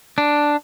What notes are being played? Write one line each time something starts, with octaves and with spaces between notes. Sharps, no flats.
D4